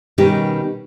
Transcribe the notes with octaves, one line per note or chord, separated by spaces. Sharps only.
B2 D#3 G3 C#4 D#4 G4